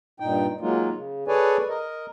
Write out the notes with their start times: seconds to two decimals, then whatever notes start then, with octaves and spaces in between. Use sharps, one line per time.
0.20 G2 A#2 D#4 G5
0.61 F#3 G#3 A#3 D#4 F4
0.95 C#3
1.28 G#4 A4 B4 C#5 D5 G#5
1.69 A#4 D#5